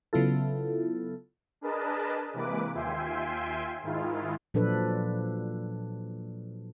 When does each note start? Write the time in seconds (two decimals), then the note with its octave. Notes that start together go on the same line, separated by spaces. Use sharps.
0.13 C#3 F#3 B3 E4 F4 A4
1.61 D4 G#4 A#4 B4 D#5 A5
2.34 C3 E3 G#3 A#3 B4 D6
2.74 D#2 F4 E5 G5 G#5 C6
3.83 G#2 D#3 G#3 E4 F4
4.54 A#2 F3 F#3 D4 A4 B4